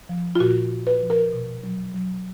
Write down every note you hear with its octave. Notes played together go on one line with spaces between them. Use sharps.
F3
F4
A#2 F#4
A#2
B4
F3
A#4
B2
F#3
F#3